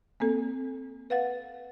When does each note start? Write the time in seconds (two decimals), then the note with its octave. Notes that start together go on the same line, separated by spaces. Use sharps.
0.20 A#3 C4 A4
1.10 B4 F5 F#5 A6